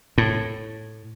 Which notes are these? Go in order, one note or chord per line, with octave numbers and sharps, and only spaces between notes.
A2